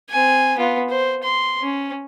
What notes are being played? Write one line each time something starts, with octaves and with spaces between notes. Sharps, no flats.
C4 G#5
B3 F4
C5
C6
C#4